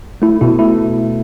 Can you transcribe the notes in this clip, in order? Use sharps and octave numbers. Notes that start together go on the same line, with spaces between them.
A3 E4
B2 E4
A3 E4